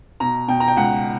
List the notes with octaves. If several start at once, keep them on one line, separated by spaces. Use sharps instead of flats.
B2 A#5
B2 G5
A#5
G5
C#2 F#5